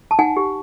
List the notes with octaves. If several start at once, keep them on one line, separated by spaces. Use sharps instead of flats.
A5
D#4 F#5 G#5
G4